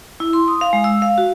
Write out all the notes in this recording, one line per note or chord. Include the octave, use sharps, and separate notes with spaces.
E4
C6
D#6
F5
G#3
E6
F5
F#4